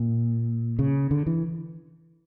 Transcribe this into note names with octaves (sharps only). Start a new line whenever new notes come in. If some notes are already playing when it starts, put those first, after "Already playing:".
Already playing: A#2
C#3
D3
E3